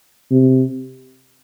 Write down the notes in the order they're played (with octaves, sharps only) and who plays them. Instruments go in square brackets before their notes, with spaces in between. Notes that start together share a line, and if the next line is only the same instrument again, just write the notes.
[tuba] C3